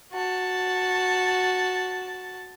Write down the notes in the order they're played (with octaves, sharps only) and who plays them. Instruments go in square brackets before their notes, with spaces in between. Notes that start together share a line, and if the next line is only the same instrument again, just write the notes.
[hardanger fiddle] F#4 A5